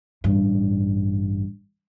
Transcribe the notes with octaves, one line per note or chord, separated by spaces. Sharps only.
A1 G2